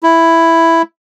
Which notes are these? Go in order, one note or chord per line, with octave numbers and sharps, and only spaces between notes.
E4